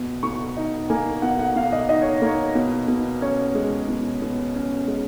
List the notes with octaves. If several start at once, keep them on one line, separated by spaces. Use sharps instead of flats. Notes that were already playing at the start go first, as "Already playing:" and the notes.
Already playing: B2
B2 C#6
D#4
A#3 G#5
B2 F#5
F#5
B2 F5
D#5
D#4 D#5
C#5
A#3 C#5
B2
B2
C#4 C#5
G#3
B2
B2
C#4
G#3